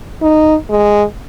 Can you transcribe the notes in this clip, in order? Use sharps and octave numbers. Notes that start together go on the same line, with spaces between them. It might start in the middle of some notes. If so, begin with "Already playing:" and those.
D#4
G#3